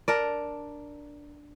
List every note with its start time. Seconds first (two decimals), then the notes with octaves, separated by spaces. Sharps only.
0.08 D4 A#4 D5